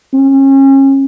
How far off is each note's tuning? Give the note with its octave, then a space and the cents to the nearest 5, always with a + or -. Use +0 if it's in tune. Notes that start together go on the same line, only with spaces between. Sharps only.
C#4 -35